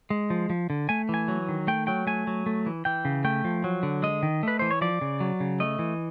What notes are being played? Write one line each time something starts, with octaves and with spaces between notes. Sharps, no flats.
G#3
F3
F3
D3
A3 G#5
E3 G#5
F#3
D#3
A3 G5
F#3 G5
A3 G#5
F#3
A3
E3
E3 G5
C#3
A3 G5
F3
F#3
D3
G#3 D#5
D#3
A3 B4
E3 C5
C#5
F3 D5
C#3
F#3
C#3
A3 D#5
E3